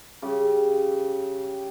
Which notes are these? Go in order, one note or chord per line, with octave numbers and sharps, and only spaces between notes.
C#3 G3 G4